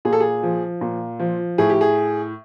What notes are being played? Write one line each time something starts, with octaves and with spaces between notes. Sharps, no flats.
A#2 G#4
A4
G#4
F3
A#2
F3
A2 G#4
G4
G#4